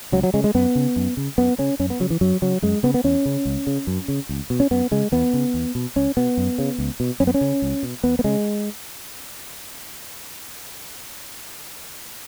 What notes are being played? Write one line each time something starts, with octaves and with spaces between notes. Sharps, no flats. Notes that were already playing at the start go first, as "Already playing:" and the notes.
C#2 F#3
F#3
C#3 G#3
G#3
F#2 B3
C#3
F#2
C#3
F#2 B3
C#3 C#4
F#2 C#4
B3
C#3 F#3
E3
F#2 F#3
C#3 F#3
F#2 G#3
C#3 B3
B3
E2 C#4
C#3
C#2
C#3
F#2
C#3
C#2
B2
C#4
F#2 B3
C#3 G#3
E2 B3
C#3
E2
B2
C#2 C#4
B2 B3
F#2
C#3
C#2
B2
F#2 C#4
B3
C#4
C#3
C#2
B2
E2 B3
B3
C#3 G#3